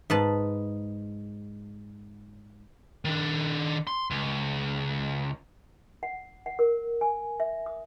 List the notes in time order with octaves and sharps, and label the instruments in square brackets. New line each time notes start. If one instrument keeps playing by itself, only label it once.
[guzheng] G#2 B4 A5
[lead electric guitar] D#3 D4
C6
C#2
[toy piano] F#5
F#5
A#4
G#5
E5
D#6